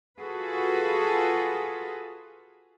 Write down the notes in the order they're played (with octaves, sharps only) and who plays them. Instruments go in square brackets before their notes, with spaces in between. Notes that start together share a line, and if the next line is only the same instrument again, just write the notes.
[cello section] F4 F#4 G#4 A4 B4